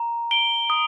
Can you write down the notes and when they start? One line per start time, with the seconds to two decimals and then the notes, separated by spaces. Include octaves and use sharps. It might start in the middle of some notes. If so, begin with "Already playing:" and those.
Already playing: A#5
0.31 D7 G7
0.70 D#6